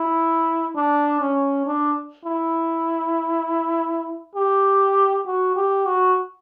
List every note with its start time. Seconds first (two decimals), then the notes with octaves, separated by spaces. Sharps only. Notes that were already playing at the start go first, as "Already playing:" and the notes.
Already playing: E4
0.76 D4
1.21 C#4
1.66 D4
2.25 E4
4.35 G4
5.26 F#4
5.56 G4
5.86 F#4